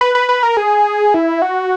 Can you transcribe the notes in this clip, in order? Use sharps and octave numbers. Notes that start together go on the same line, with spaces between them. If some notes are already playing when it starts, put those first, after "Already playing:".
B4
B4
B4
A#4
G#4
E4
F#4